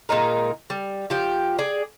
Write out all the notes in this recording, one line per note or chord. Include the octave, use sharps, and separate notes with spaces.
A#2 G#3 D#4 A#4
G3
F3 G4
G#4 D5